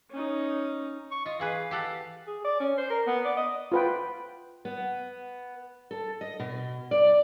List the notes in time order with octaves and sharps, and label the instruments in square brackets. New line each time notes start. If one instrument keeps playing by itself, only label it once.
[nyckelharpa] C#4 D#4
[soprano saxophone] C#6
[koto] F4 [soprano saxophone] D#5
[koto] E3 G#4 B4 [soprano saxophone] F5
[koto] G4 A4 F#5
[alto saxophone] G#4
D5
C#4
C5
A#4
B3
D5
D#5
[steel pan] F4 B4 G5
[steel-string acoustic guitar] B3
A4
D#5
B2
D5